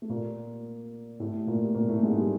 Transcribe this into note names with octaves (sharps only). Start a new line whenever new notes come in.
A3
A#2 A#3
A2 A3
A#2 A#3
A#2 A#3
A2 A3
G#2 G#3
G3